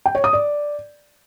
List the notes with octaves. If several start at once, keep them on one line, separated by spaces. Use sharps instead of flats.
G5
C#5
D#6
D5